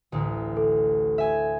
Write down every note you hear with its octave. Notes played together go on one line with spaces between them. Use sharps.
A1 D2
A4
E5 G#5